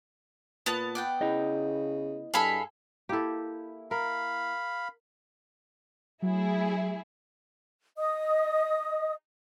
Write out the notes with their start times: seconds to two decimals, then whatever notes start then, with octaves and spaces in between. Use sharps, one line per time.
0.66 A#2 B3 A5 F#6
0.95 D5 F#5 G5
1.21 C#3 E4 D#5
2.34 G2 G#4 A4 F5 B5
3.09 A#3 E4 G4 A4
3.91 A#4 F5 B5
6.22 F#3 A3 E4 G#4
7.98 D#5 D#6